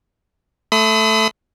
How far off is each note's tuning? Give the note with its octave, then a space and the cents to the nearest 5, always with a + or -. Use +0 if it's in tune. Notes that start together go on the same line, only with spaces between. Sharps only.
A3 +0 B5 +40 D#6 +30